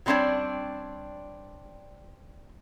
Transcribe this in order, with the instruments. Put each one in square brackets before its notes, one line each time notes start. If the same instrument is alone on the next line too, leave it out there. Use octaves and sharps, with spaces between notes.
[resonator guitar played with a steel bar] F#3 G3 C4 D4 C#5 D5